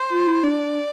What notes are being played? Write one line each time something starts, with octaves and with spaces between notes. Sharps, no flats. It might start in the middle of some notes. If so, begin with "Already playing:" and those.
Already playing: C5
F4
E4
D4 D5